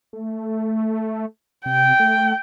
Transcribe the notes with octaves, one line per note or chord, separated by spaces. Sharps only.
A3
C3 G5
A3